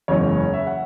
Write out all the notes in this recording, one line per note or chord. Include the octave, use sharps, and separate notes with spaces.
F#1 E2 E3 G#3 C#4 C#5
E5
F#5